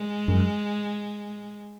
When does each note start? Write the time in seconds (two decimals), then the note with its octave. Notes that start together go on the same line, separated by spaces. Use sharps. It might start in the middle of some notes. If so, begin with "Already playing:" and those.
Already playing: G#3
0.28 F#2